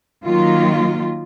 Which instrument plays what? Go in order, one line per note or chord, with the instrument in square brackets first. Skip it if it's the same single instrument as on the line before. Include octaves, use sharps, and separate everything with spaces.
[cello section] D#3 F#3 A#3 F4